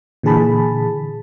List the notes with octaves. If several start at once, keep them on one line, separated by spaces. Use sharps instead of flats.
A#2 D3 E3 G#4 A5 B5